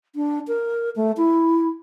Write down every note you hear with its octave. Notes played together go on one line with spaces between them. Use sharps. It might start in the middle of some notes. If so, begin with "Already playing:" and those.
D4
A#4
A3
E4